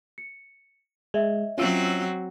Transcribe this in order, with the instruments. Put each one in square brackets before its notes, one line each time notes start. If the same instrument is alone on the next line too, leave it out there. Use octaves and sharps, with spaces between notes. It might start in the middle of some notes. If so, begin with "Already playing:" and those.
[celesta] C#7
[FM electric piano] G#3 [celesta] D#5 E5
[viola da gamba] F#3 C4 F#4 [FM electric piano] C#4 F4 E6